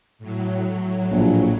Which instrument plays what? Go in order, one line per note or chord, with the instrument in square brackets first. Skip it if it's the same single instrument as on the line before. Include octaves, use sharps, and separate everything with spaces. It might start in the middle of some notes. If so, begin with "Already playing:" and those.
[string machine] A2 F#3
[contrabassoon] A#1